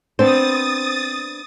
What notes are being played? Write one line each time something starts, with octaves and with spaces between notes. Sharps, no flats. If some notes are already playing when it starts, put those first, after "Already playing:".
B3 C4 D4 C5 D#6 A6